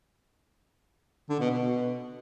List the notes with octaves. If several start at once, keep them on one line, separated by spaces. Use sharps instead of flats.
D3
B2
B2